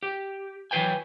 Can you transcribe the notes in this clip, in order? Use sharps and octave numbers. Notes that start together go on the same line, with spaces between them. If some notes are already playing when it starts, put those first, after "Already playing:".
G4
E3 F#3 A#4 B4 G5 G#5